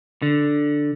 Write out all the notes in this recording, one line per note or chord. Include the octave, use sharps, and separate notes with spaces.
D3